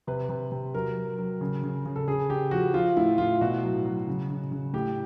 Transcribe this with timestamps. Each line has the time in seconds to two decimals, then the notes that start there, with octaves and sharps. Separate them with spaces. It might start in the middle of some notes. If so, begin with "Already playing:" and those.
0.07 C3 B4
0.29 C3
0.52 C3
0.74 F#3 A#4
0.96 F#3
1.19 F#3
1.41 C#3
1.64 C#3
1.86 C#3
1.96 A4
2.07 C#3 G#4
2.30 C#3 G4
2.51 F3 F#4
2.73 F3 F4
2.97 A2 E4
3.18 A2 F4
3.41 B2 F#4
3.63 F#3
3.85 F#3
4.08 C#3
4.30 C#3
4.52 C#3
4.73 A2 G4